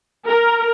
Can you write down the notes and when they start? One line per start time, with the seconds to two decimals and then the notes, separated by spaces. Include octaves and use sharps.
0.27 A#4